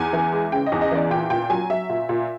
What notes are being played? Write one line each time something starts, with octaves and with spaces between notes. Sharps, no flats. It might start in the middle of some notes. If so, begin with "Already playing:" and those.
Already playing: E2 G#5
E3
G#3
C#3 G5
D#5
E2
D#5
E3 D5
A#2 G5
A#2 G5
F#3 G#5
F#3 E5
A#2
A#2